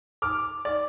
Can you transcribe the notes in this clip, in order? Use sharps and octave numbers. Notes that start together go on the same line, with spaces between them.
D6 F6
D5